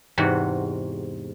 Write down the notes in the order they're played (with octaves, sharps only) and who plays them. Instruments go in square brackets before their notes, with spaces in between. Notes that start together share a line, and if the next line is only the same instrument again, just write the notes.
[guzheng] E2 G#2 C3 F#4